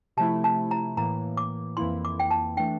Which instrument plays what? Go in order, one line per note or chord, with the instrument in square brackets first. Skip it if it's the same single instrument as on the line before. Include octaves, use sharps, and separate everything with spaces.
[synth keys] C3 F3 A3 E4 [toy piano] A5
[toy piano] A5
A#5
[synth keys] A2 E3 A#3 [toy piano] A#5
[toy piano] D6
[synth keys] F2 E3 A#3 E4 [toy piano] C6
[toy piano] D6
G5
A5
[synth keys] E3 A3 D4 [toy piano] G5